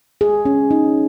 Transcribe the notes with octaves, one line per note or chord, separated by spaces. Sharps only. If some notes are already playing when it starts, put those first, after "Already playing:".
G#4
C#4
D#4